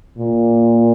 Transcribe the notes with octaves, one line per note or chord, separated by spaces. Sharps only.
A#2